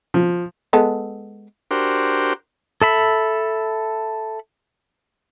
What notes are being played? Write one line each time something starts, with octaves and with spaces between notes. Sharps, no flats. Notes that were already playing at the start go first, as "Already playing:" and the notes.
F3
G#3 B3 A4
D4 F#4 G4 A#4 C5
A4 E5 B5